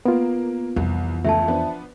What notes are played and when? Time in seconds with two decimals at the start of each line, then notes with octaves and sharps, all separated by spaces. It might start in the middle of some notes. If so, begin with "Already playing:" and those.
0.05 A#3 B3 F4
0.76 C2 F2 E3
1.25 C#2 A3 E5 A5
1.48 F3 B3 D4